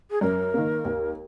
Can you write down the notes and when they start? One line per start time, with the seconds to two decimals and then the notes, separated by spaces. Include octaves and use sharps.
0.11 G#4
0.21 F#2 A#4
0.54 D#3 A#3
0.85 D#2